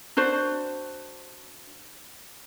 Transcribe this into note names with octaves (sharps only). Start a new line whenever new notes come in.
D4 F#4 C5